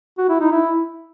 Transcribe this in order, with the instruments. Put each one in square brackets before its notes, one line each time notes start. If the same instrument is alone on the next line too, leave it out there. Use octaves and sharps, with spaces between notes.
[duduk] F#4
E4
D#4
E4